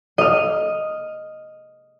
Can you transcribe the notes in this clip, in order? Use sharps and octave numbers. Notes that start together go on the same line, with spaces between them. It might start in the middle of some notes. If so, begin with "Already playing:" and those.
D#5 F6